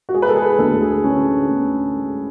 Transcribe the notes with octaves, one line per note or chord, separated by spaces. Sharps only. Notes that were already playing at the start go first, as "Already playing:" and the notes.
F#4
G#3 G#4
B4
A4
G#4
D2 A4
G#4
D3 C#4
D2
G#3